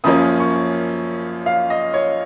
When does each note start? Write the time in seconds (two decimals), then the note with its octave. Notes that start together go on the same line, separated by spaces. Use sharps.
0.04 F#2 F3 A#3 C#4 D#6
0.40 C#6
1.46 F5
1.70 D#5
1.94 C#5